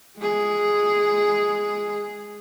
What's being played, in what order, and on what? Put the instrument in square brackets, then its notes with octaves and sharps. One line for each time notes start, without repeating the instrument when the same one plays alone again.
[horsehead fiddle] G#3 G#4